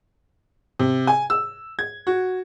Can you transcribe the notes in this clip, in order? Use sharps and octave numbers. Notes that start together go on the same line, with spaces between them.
C3
G#5
E6
G#6
F#4